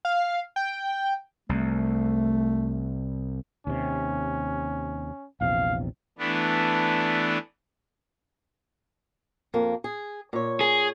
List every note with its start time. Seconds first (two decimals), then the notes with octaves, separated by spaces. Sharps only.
0.05 F5
0.56 G5
1.49 C2 A3
3.67 D#2 C3 C#4
5.41 A#1 E2 C3 F5
6.18 E3 A3 B3 D4
9.54 F2 A#3
9.84 G#4
10.33 A#2 C#5
10.61 G#4